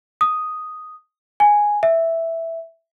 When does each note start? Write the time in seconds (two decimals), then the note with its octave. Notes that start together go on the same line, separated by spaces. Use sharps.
0.21 D#6
1.40 G#5
1.83 E5